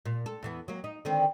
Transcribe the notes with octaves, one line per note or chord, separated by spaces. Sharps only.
A#2
A4
E2 E3 B3
F#3 A#3
D#4
D3 D#3 C4